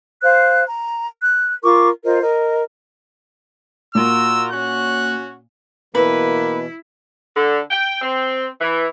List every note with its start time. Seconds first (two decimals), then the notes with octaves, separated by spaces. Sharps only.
0.23 C5 F5 F#6
0.67 A#5
1.23 F#6
1.63 F4 A#4 C#6 D6
2.05 F4 A#4 C5 D#5
2.22 A#4 D#5
3.95 A#2 F4 F#4 A#4 E6
4.52 C#4 F#4 F#6
5.95 B2 E3 A#3 E4 B4
7.36 D3
7.70 G5
8.02 C4
8.61 E3